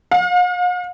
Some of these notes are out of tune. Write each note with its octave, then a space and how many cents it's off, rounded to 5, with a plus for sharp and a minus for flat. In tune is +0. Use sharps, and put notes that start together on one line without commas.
F5 +45